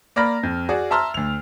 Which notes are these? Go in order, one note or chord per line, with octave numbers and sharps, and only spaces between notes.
A#3 D5 B5 F6 A#6
F2
F#4 G#4 D5
E5 A5 A#5 C6 E6 F6
D2 F7